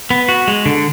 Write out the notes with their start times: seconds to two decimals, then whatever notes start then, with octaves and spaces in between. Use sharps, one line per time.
0.10 B3
0.29 F#4
0.48 G#3
0.66 D3